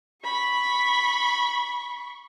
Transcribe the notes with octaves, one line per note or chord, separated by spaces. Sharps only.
B5 C#6